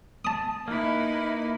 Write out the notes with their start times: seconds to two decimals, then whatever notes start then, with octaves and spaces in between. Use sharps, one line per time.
0.25 A5 D#6
0.68 A#3 D#4 E4 B4